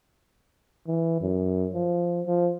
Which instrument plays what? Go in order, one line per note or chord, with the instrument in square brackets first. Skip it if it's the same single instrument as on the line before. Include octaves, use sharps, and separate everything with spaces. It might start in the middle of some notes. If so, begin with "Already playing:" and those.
[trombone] E3
F#2
F3
F3